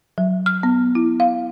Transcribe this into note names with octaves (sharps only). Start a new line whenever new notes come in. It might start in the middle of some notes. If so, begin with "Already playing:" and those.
F#3
F6
B3
E4
F5